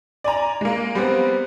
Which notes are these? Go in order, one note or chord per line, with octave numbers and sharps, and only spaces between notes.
D5 G#5 A#5
G#3 A#3
G3 B3 C4